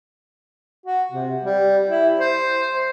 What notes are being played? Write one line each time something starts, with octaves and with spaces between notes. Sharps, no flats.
F#4
C3
G3
E4
C5